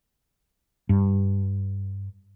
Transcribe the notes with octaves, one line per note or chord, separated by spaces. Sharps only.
G2